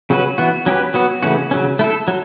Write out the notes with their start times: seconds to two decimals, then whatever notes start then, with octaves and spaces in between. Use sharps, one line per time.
0.10 C#3 F#3 C#4 F#4 B4
0.38 E3 B3 F#4
0.66 F#3 C#4 G4 B4
0.94 F#3 B3 F#4
1.23 C#3 E3 A3 C#4 F#4
1.51 C#3 F#3 C#4
1.79 A3 E4 A4
2.08 F#3